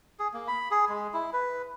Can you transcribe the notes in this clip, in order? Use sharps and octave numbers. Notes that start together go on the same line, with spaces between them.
G#4
A#3
B5
G#4
G#3
E4
B4